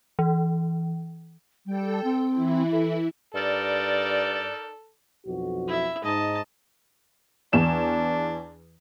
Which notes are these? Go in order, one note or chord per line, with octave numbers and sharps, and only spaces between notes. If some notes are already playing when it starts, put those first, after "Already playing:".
E3
G3 A4 G5
C4
E3 E4
A4
G2 D#4 A4 A#4 D5
B1 F2 F#4
E4 E5
G#2 D#5 A5
E2 D4 E7